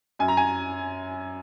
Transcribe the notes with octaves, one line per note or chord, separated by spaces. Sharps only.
F#2 G#5
A#5
G#5